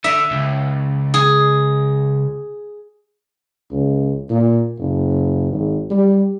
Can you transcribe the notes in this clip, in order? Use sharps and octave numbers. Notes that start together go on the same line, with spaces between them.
D3 E5
C#2
G#4
C#2
A#2
F#1
G#1
G3